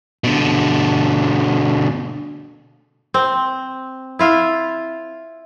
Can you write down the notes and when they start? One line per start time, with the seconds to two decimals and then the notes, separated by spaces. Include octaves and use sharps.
0.24 B2 D3
3.14 C4
4.19 E4 F4 E5